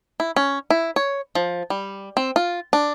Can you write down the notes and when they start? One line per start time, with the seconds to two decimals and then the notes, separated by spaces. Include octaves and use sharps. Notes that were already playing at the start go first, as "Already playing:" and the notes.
0.20 E4
0.36 C#4
0.70 E4
0.96 C#5
1.35 F3
1.70 G3
2.17 C4
2.36 F4
2.73 D4